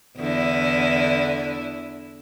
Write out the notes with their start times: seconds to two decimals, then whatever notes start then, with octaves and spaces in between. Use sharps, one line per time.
0.18 E2 D3 E4